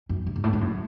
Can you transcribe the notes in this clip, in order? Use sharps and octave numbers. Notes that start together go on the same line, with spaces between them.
F#2
G2
G#2
A2
G#2
F#2